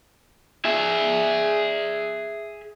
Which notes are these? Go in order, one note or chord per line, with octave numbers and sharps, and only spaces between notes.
G#4 E5